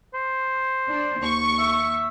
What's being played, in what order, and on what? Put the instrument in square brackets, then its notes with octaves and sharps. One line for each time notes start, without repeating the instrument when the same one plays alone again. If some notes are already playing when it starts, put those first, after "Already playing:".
[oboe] C5
[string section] D4
D#2 C#6
[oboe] E5